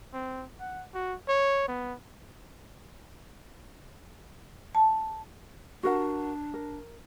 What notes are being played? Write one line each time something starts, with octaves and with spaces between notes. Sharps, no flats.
C4
F#5
F#4
C#5
B3
A5
D4 F#4 A#4 F#5
A#4